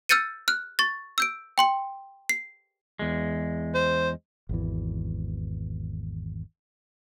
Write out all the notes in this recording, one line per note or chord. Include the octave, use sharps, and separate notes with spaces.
E6 F6 G6 A6 C#7 D#7
F6 F#6
C#6 A6
E6 G6 D7
G5 C6 C#7
C7
E2 G#3
C5
G#1 E2 E3